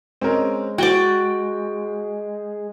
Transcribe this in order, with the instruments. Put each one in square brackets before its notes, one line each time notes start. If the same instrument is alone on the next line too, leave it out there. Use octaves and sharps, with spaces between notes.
[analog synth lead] G#3 [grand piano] C4 C#4 A#4
[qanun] F#4 D5 [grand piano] G5 G7